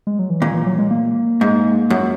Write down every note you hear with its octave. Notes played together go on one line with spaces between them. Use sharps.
G#3
F#3
E3
A#2 D#3
E3
F#3
G#3
A#3
G#2
F#2